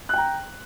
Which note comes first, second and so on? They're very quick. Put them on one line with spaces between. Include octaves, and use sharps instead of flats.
F#6 G5 A#5